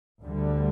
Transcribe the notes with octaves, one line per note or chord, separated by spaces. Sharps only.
D2 D3 G3